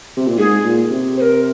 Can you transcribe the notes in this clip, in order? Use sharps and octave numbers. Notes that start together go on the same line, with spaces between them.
C3
A#2
G#2 G#4
A#2
C3
C5
A#4